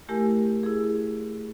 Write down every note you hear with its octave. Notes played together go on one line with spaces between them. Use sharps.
A3 E4 G4 A#4 G#5
E4 G#4